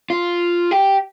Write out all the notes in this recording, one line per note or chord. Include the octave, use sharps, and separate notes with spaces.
F4
G4